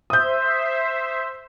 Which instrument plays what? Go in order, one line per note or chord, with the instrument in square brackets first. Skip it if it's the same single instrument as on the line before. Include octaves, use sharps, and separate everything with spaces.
[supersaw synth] C5 E5 [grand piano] D#6 G6